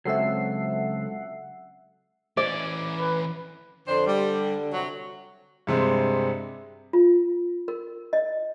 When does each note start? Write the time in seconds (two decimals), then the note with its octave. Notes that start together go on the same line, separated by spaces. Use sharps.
0.05 C#2 F#3 C4 A4 E5 F#5 E6 C7
2.37 E3 C#4 D5
2.99 B4
3.88 F2 D3 D4 C5
4.06 G3
4.73 C3 F#3
5.67 G2 C3 G#3 C4
6.93 F4
7.68 A#4
8.13 D#5